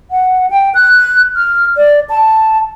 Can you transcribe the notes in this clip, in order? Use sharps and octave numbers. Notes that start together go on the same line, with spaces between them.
F#5
G5
F#6
F6
D5
A5